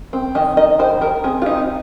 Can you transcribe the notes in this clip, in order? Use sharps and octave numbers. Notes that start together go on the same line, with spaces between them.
C4
D#3 D#5
D#4 D#5
D#3 C5
D#3 A#4
C4 G#4
F4
C4 D#4